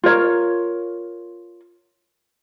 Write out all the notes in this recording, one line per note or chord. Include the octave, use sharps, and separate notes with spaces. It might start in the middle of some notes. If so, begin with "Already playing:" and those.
F4 A#4 C#5